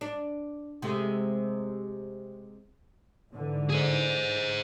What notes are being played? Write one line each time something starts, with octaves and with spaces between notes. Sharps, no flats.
D4
C3 G#3 A3
G#2 D3 E3
G#4 C5